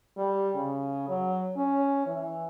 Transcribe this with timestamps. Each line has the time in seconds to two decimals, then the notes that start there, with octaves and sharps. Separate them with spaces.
0.17 G3
0.55 C#3
1.09 F#3
1.57 C#4
2.07 E3